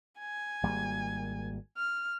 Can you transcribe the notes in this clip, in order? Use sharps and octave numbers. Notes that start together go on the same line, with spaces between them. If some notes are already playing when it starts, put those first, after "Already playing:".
G#5
G#1 G3 A#3
F6